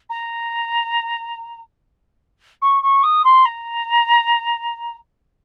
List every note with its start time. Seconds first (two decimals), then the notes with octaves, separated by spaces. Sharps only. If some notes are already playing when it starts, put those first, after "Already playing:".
0.10 A#5
2.62 C#6
2.83 C#6
3.03 D#6
3.25 C6
3.45 A#5